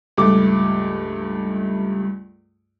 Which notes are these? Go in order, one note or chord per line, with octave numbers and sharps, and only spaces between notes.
C#2 G2 A3 D6